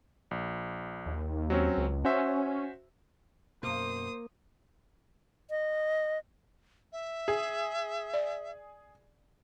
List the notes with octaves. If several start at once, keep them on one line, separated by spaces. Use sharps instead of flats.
A#1
D#2
F#3 C4 C#4
C#2
C#4 F#4 C5 E5
F#2 B2 A#3 C5 D#6
D#5
E5
G#4
D5